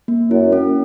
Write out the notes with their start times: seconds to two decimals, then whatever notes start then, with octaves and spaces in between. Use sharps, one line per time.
0.08 A#3
0.31 F#2 E4
0.52 C#4